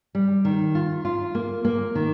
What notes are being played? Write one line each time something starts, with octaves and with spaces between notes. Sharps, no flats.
G3
D#3
F4
F4
A#3
A#3
D#3